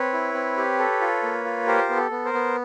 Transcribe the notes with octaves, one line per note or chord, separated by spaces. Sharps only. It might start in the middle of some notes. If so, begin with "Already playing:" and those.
Already playing: C4 B4 C#5
E4
C4
G4
A4
F4
A#3
F4
G4 A#4 C5
B3
A4
B3
A#4 C5
B3